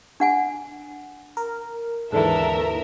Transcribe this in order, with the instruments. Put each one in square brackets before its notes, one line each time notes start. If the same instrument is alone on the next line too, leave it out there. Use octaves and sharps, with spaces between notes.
[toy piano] D4 F#5 G#5
[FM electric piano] A#4
[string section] D#2 A#4 E5 [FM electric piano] G#2 D3 E3 [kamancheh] A4